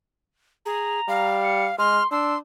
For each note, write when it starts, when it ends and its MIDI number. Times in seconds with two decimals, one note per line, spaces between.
0.66 1.01 68
0.66 1.35 82
1.08 1.69 55
1.08 1.76 77
1.43 1.66 97
1.78 1.99 56
1.78 2.09 84
1.78 2.03 89
2.11 2.36 62
2.11 2.38 84
2.11 2.34 88